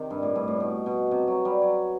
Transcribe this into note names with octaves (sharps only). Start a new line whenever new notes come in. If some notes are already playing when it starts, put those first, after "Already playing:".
Already playing: C3 D#3
G2
A2
G2
A2
B2
B2
C3
F#3
G3
F#3